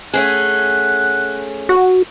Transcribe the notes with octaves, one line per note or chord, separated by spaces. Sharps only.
A3 C#4 G#4 F#5
F#4